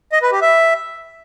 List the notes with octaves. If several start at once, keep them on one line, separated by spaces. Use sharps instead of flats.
D#5
B4
G4
E5